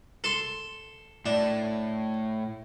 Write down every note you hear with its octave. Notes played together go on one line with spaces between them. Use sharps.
A4 C6
A2 D4